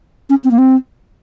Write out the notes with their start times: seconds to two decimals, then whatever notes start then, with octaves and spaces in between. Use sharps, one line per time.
0.30 C#4
0.44 C4
0.51 A#3
0.58 C4